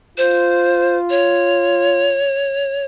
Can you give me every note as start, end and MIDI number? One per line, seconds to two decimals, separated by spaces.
0.18 2.26 65
0.18 0.97 72
1.10 2.86 73